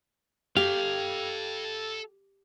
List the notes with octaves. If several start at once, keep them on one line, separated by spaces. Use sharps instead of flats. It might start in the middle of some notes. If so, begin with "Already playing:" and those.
G4 A4 F5 G5